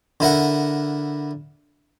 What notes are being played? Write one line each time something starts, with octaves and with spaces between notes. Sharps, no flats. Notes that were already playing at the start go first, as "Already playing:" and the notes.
D3 E4 A#4 F#5